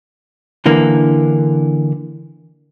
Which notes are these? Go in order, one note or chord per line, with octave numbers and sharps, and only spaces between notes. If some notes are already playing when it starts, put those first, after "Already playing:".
D3 E3 A#3